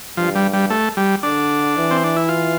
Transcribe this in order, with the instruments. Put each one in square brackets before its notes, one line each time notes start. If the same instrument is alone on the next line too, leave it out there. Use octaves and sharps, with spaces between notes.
[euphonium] G2 [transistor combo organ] F3
[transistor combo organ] G3
G3
A3
G3
[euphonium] D3 [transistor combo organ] D4
[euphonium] E3
[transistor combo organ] C4
D4
E4
F4